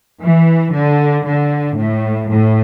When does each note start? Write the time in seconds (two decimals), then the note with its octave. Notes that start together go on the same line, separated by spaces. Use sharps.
0.23 E3
0.75 D3
1.27 D3
1.79 A2
2.30 A2